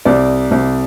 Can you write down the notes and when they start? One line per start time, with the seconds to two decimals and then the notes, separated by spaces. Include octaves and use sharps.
0.05 C2 D5
0.51 C2